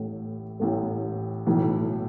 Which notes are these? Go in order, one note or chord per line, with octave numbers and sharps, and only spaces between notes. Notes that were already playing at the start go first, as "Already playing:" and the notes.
Already playing: A1 A2 A3
A1 A2 A3
B1 A2 E3